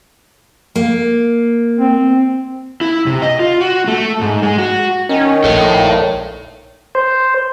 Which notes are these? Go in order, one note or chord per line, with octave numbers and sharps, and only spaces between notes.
A#3
C4
E4
C3
D#5
F4
F#4
A3
G#2
G#3
F#4
D#3 C#4
A#1 A4 C#5
C5